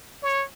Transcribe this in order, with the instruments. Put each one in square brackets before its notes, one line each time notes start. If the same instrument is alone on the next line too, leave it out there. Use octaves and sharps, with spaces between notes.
[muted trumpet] C#5